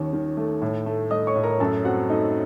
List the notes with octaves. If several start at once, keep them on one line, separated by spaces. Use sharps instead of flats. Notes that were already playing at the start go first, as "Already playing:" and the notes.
Already playing: D#2 D#3 C#4
D#3
A3
A2
A3
A3 D#5 D#6
C#5 C#6
A2
A#4 A#5
F#2 A4 A5
C4 F#4 F#5
A3 D#4 D#5